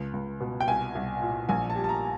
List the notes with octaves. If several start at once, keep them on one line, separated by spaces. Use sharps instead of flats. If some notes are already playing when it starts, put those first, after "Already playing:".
Already playing: C#2
C#2
B2
G5
C2 G#5
C2
A#2
A#1 G#5
A5
G3
A5
A#5